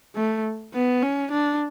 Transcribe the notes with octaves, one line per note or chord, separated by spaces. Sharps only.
A3
B3
C#4
D4